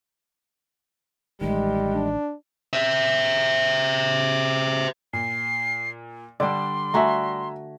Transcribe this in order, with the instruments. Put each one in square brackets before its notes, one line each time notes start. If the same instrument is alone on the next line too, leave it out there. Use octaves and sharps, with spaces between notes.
[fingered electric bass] A1 D#3 [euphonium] G3 [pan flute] G#3
[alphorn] D4
[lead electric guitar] C5 E5
[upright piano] A#2 [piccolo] C7
[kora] D3 D4 [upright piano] G3 D5 [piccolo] C6
[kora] A3 F#4 [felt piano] E5 G#5 A#5